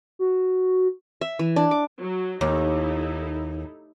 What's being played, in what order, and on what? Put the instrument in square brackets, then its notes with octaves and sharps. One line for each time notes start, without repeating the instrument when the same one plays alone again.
[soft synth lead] F#4
[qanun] E5
E3
D4
D6
[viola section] F#3
[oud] D#2 [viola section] D#4 E4 A4